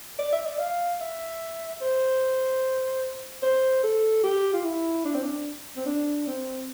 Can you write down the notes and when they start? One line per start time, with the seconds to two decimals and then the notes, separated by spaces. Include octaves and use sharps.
0.19 D5
0.32 E5
0.46 D5
0.59 F5
1.01 E5
1.81 C5
3.43 C5
3.83 A4
4.24 G4
4.54 F4
4.64 E4
5.05 D4
5.14 C4
5.23 D4
5.77 C4
5.86 D4
6.27 C4